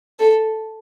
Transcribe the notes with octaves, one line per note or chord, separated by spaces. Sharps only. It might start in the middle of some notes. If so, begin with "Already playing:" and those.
A4